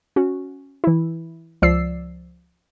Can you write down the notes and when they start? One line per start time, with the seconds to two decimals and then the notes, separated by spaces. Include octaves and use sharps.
0.16 C#4 F#4
0.84 E3 E4
1.62 C#2 F3 D5 E6 C7